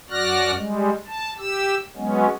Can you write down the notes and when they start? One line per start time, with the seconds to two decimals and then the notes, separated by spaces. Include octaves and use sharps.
0.10 F#2 F#4 D5 F6 F#6 A#6
0.56 G3 G#3
1.06 A5
1.38 G4 E6
1.96 F#3 G#3 B3 C#4